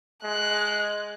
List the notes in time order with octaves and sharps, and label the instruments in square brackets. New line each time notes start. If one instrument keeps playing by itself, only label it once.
[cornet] G#3 [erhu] F#6